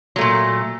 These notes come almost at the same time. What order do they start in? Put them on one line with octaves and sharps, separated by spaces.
F#3 A3 A#2